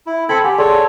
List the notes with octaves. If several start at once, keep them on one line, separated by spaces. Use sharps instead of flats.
E4
C4 A4 B5 G#6 C#7
G4 F#5 G#5
G#4 A4 C#5 D5 C6